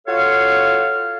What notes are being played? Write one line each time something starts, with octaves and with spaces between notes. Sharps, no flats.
F4 F#4 A4 C#5 F5